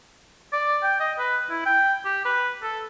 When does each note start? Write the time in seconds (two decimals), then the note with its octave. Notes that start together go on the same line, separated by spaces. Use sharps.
0.53 D5
0.83 G5
1.00 D#5
1.18 B4
1.50 E4
1.66 G5
2.05 G4
2.25 B4
2.62 A4